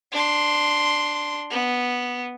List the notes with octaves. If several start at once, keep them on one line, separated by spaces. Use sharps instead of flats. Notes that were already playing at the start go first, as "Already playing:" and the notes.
D4 C6
B3